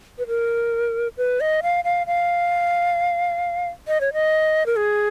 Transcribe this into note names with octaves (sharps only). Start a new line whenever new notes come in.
B4
A#4
B4
D#5
F5
F5
F5
D#5
C#5
D#5
A#4
G#4